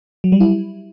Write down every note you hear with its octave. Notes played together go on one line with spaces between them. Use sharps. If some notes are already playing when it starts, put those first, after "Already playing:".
F#3
G3
E4